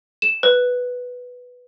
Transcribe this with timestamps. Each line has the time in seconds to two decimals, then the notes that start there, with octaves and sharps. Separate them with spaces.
0.22 E7
0.43 B4